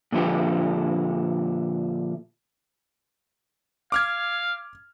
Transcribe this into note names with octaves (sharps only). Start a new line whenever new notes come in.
A#2 D3 F3 E4 G4
F5 D6 F6 G#6